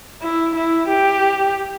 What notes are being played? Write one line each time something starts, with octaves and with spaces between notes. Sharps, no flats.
E4
E4
G4